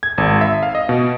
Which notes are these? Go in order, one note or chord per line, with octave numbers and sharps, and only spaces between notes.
G#6
G#1
E5
F5
D#5
B2